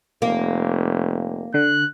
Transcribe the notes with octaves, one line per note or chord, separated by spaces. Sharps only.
F1 A#3
D3 F#6